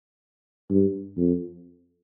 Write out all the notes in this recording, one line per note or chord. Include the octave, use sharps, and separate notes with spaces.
G2
F2